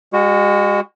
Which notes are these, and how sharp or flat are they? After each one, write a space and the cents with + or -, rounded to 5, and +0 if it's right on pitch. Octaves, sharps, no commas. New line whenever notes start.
G#3 -35 F#4 +0